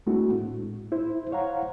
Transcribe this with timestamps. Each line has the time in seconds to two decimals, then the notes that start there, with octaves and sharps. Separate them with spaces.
0.07 G#3 A3 C4 D4 E4 F#4
0.33 A2
0.92 E4 C5
1.32 C5 C#5 F5 F#5 A#5